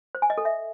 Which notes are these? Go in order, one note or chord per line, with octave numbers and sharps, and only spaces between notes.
C5
G#5
D#5
A4
E5